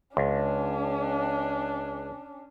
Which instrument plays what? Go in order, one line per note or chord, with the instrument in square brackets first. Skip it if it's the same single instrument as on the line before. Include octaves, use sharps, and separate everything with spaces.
[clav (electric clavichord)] C#2 [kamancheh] C#4 D4